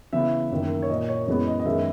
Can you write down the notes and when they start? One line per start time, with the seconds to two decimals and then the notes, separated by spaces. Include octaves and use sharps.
0.13 C#3 E3 B3 E5
0.51 F#2 D#3 A#3
0.82 C#5
0.89 A#2 A#3 D#5
1.09 C#5
1.27 F#2 E3 G#3 B3 C#5
1.47 D#5
1.60 D#5
1.65 F#2 D#3 G#3 B3 E5